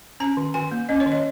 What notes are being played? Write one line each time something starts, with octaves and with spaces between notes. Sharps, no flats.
C#4 A#5
D#3
D#3 G#5
A#3
C#4 D#5
C#5
D#3
D#5